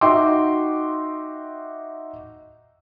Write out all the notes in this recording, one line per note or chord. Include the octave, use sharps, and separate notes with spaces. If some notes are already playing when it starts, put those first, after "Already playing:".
D#4 F#4 E5 G5 C6 D6